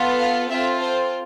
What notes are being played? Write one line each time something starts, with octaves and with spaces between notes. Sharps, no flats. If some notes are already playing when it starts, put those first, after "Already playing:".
Already playing: B3 F4 A4
F5
C4 F4 A4 E5
C5